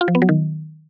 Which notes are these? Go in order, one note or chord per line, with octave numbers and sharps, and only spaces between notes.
F4
F3
B3
F#3
D#3